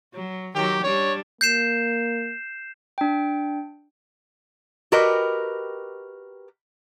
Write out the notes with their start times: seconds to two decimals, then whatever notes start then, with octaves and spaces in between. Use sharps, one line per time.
0.14 F#3
0.55 D#3 F#3 G4
0.84 G3 D4 C#5
1.41 A#3 G6 C7 E7
2.98 D4 G5
4.92 F#4 G4 A#4 B4 D#5